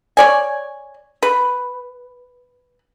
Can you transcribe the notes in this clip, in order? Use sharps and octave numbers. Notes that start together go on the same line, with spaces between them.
C#5 D5 G#5
B4